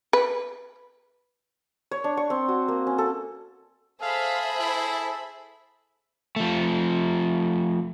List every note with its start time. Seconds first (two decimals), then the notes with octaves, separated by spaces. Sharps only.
0.13 B4
1.91 C#5
2.04 D4
2.17 C#6
2.30 C4
2.48 F#4
2.68 A#3
2.87 C#4
2.98 A4
4.02 G#4 A4 C5 E5 F5 B5
4.60 E4
6.36 F3 A3